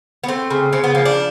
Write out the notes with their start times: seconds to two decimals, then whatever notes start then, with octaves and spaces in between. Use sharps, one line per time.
0.24 B3
0.28 A3 C4
0.50 C#3
0.73 C#3 C4
0.84 B3
0.95 F3 A#3
1.05 D4